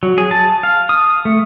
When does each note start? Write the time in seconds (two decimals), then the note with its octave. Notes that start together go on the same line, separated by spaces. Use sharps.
0.03 F#3
0.18 G#4
0.31 A5
0.63 F5
0.89 D#6
1.25 A3